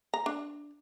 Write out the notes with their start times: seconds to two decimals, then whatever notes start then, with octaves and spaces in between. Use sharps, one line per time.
0.14 A#5
0.26 D4